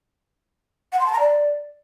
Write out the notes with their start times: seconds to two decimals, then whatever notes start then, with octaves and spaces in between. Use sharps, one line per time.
0.92 F#5
0.99 C6
1.06 A5
1.13 A#5
1.19 D5